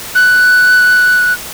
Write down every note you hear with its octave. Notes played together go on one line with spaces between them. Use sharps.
F#6